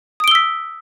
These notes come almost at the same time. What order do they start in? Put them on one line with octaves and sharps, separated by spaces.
D#6 D7 G7 E6 B6